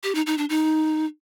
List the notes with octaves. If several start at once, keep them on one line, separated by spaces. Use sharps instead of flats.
G4
D#4
D#4
D4
D#4